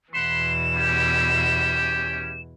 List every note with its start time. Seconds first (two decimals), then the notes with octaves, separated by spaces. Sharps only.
0.14 E2 B2 E3 F#5 B5 C6 E7
0.76 C#4 G4